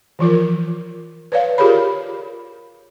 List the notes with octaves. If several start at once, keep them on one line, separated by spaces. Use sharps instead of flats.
E3 F3 F4 A#4
B4 C#5 D5 F5
F4 G4 G#4 A#4 C#5 B5